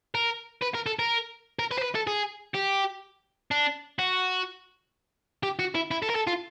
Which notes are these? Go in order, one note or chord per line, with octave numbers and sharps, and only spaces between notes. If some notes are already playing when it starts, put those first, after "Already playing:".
A#4
B4
A#4
A4
A#4
A#4
B4
C5
B4
A4
G#4
G4
D4
F#4
G4
F#4
E4
E4
A4
A#4
A4
F4